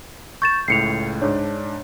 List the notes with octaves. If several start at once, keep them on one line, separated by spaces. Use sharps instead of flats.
C#6 G6 A6 E7
C#2 A2 C7 C#7 F7
G#2 D4 C#5